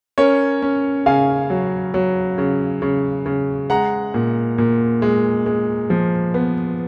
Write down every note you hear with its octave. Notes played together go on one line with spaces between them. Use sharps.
C#4 A#4 C#5
C#4
C#3 F5 G#5
F#3
F#3
C#3
C#3
C#3
G#3 F#5 A#5
A#2
A#2
G#3
G#3
F3
B3